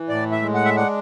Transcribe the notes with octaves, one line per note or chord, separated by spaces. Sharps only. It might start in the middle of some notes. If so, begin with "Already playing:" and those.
Already playing: E3
A2 D5
E5
G#3
F#5
E5
D4 F#5